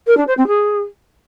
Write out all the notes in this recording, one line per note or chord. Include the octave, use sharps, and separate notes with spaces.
A#4
D4
C5
C4
G#4